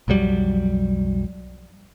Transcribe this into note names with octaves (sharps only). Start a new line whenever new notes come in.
B1 F2 F#3 G3